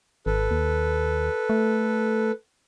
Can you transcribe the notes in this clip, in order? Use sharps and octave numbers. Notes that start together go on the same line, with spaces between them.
G#1 A4 B4
D#2
A3